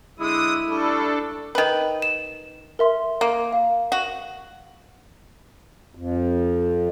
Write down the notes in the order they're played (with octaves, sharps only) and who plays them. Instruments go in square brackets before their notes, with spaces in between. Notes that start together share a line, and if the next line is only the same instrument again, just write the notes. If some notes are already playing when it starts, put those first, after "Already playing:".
[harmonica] D3 G#3 E6 [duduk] E4 [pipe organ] D#6
[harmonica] G3 A3 [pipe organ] D4 A4
[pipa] D#3 B4
[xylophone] E7
A#4 E5 C6
[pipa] A#3
[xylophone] F5
[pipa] F#4
[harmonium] F2